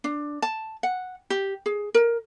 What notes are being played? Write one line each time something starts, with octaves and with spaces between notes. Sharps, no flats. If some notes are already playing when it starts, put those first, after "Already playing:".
D4
A5
F#5
G4
G#4
A#4